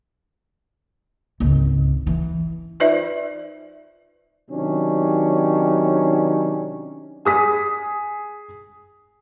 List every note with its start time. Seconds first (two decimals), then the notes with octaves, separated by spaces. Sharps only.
1.40 G#1 C#2
2.07 E3
2.80 D#4 F4 B4 C5 D5 E5
4.50 C3 D#3 F#3 C#4 D4
7.25 G#4 D#6 B6